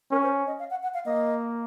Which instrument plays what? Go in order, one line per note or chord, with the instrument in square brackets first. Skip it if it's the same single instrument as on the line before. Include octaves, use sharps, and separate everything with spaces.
[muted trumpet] C#4 [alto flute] A#4
[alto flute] C5
D#5
F5
F#5
F#5
F5
[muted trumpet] A#3 [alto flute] D#5